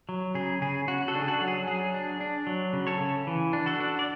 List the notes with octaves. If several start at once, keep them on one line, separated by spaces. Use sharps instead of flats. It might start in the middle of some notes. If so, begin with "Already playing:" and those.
F#3
C#3 G#4
C#3 G#4
C#3 F#4
F#4 A4
D4
G#4
F#4 A4
F#3
G#4
F#3 G#4
D4
D4
F#3
C#3
A4 C#5
C#3
E3
D4
F#4 A4
D4
D5